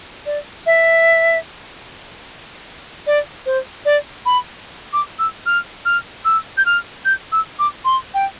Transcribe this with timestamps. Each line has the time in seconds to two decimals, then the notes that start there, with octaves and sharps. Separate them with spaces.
0.26 D5
0.66 E5
3.07 D5
3.46 C5
3.85 D5
4.26 B5
4.93 D6
5.19 E6
5.46 F6
5.85 F6
6.25 E6
6.57 G6
6.66 F6
7.05 G6
7.32 E6
7.59 D6
7.85 C6
8.14 G5